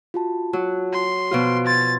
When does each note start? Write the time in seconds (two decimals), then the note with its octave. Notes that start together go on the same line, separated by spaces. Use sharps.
0.14 F4 F#4 A5
0.53 F#3
0.93 C6
1.31 B2 F3 F4 F#4 F5 D7
1.66 C6 G#6 A6